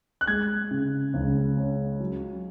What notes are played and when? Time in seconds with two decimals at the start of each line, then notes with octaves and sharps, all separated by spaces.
0.21 F#6
0.27 G#3 G#6
0.71 C#3
1.14 C#2
1.57 C#4
2.00 F#3